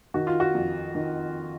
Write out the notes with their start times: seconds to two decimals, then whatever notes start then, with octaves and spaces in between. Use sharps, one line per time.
0.14 D#3 F#4
0.27 F4
0.40 F#4
0.54 F2
0.95 D#3